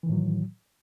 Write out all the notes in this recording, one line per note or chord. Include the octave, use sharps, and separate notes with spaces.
A2 D#3 E3 F#3